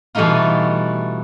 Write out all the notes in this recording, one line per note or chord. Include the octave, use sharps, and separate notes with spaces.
B2 E3 G3 A3 D#4 F4